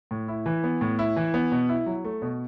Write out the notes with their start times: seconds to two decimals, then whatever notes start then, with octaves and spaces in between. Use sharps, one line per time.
0.11 A2
0.28 E4
0.46 E3
0.64 B3
0.81 A2
0.99 E4
1.16 E3
1.34 B3
1.52 B2
1.69 E4
1.86 F#3
2.04 A3
2.22 B2